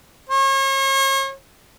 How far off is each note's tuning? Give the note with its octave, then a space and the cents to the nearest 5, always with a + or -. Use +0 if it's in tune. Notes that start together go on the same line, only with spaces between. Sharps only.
C#5 -40